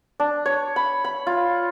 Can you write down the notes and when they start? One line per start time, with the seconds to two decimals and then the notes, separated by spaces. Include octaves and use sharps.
0.20 D4
0.46 C#5
0.76 B5
1.04 B5
1.27 F4